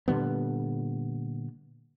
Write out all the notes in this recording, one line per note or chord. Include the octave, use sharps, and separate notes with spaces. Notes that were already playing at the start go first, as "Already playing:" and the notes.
A#2 D3 G3 B3